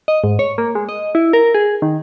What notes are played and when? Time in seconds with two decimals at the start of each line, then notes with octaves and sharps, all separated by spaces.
0.08 D#5
0.24 G#2
0.39 C#5
0.58 A#3
0.75 G#3
0.89 D#5
1.15 E4
1.33 A#4
1.55 G#4
1.82 D#3